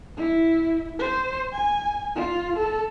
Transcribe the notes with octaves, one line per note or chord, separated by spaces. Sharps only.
E4
C5
G#5
F4
A4